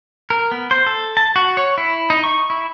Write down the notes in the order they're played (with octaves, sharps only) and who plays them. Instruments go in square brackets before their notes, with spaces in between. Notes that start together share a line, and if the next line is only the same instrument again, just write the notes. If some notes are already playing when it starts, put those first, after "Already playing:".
[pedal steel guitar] A#4
B3
C5
A4
A5
F#4
C#5
E4
D#4
C#6
E4